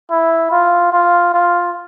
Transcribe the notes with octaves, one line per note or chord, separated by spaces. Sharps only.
E4
F4
F4
F4